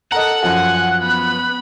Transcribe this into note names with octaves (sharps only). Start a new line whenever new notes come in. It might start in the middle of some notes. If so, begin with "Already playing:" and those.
A4 A#4 D#5 F#5 A#5
F#2 F3 F#4 G#5 F#6
B3 B5